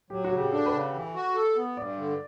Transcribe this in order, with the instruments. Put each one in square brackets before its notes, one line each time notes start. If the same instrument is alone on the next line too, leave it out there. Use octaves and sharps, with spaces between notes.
[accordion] F#3 [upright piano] G4
[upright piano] F#4
[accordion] C#3
[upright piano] G4
[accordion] D4 [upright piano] A4
[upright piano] B4
[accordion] C#3
E3
F#4
A4
B3
[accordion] G2 [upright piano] D5
[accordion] D3